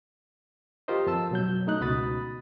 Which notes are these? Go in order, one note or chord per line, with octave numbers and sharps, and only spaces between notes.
F4 G4 A#4 C5 D#5
F2 A5 E6
B2 F#3 G6
A3 D#4 F#6
C#2 B2 F#4 B5 D#6 A6